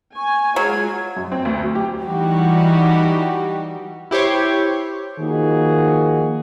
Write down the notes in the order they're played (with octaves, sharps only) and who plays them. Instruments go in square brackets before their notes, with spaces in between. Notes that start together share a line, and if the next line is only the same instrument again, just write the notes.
[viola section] G#5 [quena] C#6
[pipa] F#3 [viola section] G#3 F4 [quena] G#6
[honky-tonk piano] F#2
C4
D2
F#3
G4
[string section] E3 G3 D#4 F#4 G4
[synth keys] E4 G4 C5 C#5
[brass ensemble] D#3 F3 A#3 D#4 F#4 G#4